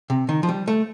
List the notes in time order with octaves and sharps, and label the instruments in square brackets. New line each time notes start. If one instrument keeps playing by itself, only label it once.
[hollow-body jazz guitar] C3
D#3
F3
G3
A3